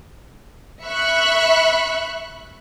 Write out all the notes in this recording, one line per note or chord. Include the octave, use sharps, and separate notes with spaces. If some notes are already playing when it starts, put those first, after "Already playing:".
E5 B5 C#6 F#6